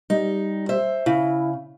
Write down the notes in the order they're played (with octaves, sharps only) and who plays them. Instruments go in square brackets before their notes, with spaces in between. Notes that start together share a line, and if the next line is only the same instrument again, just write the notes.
[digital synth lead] G3 [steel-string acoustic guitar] D#4
[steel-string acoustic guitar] C5 E5
[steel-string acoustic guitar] C#3 [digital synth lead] E4